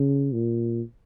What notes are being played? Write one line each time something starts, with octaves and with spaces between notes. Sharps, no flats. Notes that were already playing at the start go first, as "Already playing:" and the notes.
Already playing: C#3
A#2